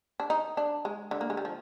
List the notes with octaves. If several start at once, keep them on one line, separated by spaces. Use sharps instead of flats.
D4
D#4
D4
G#3
D3
A#3
G#3
G3
F3